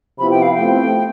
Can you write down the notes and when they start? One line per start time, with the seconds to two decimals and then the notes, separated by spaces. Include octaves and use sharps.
0.19 C3 F3 B3 E4 G4 B5
0.31 G5
0.42 F5
0.55 F3 A3 C4 G5